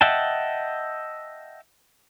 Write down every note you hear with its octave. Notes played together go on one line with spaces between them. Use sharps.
D#5 E5 F#5 G5 A5